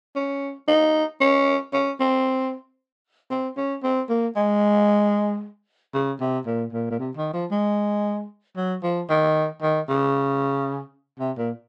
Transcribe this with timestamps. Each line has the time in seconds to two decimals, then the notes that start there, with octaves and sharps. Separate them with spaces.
0.16 C#4
0.68 D#4
1.20 C#4
1.73 C#4
2.00 C4
3.30 C4
3.57 C#4
3.83 C4
4.09 A#3
4.36 G#3
5.94 C#3
6.20 C3
6.46 A#2
6.73 A#2
6.90 A#2
6.99 C3
7.17 D#3
7.33 F3
7.51 G#3
8.57 F#3
8.83 F3
9.09 D#3
9.62 D#3
9.88 C#3
11.19 C3
11.38 A#2